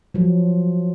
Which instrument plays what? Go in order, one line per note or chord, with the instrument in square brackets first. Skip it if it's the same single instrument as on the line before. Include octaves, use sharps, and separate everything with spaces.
[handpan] F3 F#3